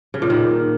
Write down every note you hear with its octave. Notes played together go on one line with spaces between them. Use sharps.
C#3
A#2
D#3